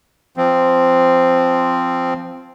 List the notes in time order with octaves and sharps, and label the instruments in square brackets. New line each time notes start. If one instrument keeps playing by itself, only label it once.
[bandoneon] F3 C4